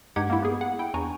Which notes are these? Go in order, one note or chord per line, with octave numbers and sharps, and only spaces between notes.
G2 G#3 D#4 G4 F#5 G#6
A#3 E4
B3 G#4
F#5
E4 G5
E2 D4 G#5 A#5 C#6